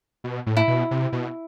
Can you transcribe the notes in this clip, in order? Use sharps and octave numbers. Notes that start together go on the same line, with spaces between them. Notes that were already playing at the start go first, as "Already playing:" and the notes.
B2
A2
E4
B2
C3
B2